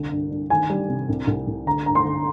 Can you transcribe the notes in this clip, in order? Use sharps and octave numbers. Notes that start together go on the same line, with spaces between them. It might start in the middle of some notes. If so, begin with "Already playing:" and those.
Already playing: C2 D3
G2
G2
D#3 G#5
G3
C3
C2
C2
C2
D3 A#5
G2 A#5
C6
D3